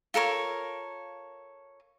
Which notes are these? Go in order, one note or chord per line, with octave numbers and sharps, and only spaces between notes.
F4 A4 A#4 C#5